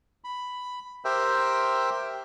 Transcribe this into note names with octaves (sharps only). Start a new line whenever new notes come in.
B5
G4 A#4 C5 E5 G5